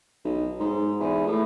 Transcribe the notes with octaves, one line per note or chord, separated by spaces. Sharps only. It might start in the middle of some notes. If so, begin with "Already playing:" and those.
B1
G#2
E2
A2